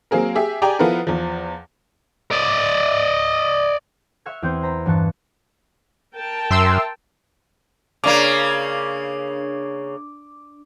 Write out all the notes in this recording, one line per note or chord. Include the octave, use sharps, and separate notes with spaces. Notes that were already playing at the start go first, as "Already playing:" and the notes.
F#3 A#3 C4 G#4 A#4
G4 G#4 E5
G4 G#4 D5 G5 G#5 A#5
F3 B3 E4 F4 A4 A#4
E2 F3
D5 D#5
E5 F#5 C#6 F6 G#6
E2 C4 G6
C5 A#5 B5
G2 E3 F#5 A5 C#6
A#4 G5 A5
F#2 E5 C6 E6
C#3 A#3 D4 D6